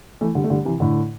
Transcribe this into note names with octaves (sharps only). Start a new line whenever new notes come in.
E3 A3
D3 G3
A3
D3 G3
C3 E3
A2 D3